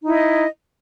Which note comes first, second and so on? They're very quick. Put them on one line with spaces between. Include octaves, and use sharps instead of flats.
D#4 E4 D#5